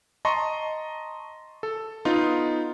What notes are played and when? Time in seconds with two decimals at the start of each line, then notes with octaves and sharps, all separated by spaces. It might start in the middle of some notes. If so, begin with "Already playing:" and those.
0.25 D#5 A5 A#5 C6 C#6
1.63 A4
2.05 B3 D#4 F4